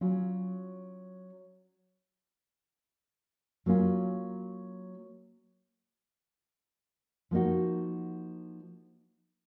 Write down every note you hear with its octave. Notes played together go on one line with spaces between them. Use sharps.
F#3 C#4 F4
F#3 A#3 C#4 F4
F3 A#3 D#4 F#4